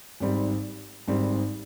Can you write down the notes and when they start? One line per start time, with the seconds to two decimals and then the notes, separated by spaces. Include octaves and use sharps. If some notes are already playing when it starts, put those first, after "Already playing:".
0.20 G#1 G#2 G3 C4
1.08 G#1 G#2 G3 C4